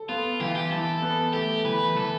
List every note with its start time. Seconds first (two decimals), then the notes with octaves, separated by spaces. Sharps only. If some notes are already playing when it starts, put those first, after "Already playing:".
Already playing: A4
0.09 B3 F4
0.40 E3 G4
0.47 F4
0.55 G4
0.71 E3 A4
1.02 B3
1.33 A3 G4
1.65 E3 B4
1.95 E3 A4